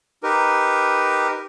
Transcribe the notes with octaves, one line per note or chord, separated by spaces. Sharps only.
D#4 G4 A#4 B4